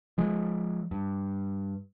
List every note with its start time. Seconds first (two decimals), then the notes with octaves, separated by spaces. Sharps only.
0.18 F3 G#3
0.91 G2